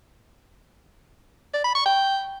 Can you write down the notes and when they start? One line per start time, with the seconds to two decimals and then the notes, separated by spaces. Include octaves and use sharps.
1.54 D5
1.64 B5
1.75 C#6
1.85 G5